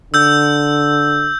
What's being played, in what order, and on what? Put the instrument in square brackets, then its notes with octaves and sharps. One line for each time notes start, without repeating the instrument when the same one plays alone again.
[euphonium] D3 [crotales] E6 G6